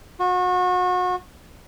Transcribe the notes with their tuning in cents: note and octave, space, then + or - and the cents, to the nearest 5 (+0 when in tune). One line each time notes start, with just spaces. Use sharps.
F#4 -30